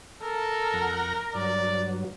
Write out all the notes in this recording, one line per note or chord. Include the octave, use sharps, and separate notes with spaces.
A4 A#4
F2 F#5 A#6
G2 F#3 D5